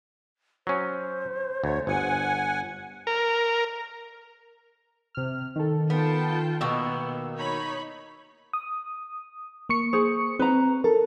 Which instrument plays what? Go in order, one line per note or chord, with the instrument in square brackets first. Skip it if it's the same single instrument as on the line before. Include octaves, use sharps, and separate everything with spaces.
[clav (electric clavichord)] F#3 C#4 [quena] C5
[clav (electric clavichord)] D2 [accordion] C#5
[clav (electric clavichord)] G1 [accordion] F#5 G#5
[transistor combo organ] A#4
[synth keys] C3 F6
D#3 A4
[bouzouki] B3 [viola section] F4 G5 A5
[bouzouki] B2 D#3 A#3 [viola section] B3 [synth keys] E6
[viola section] D#4 C#5 B5
[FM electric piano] D#6
A#3 C#6 C#7
[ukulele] G#4 C5
[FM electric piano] C4 [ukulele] B4 A#5
[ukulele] A4 [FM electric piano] A#4